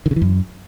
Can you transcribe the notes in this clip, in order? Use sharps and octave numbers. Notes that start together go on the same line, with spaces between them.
D#3
C#3
E3
F#2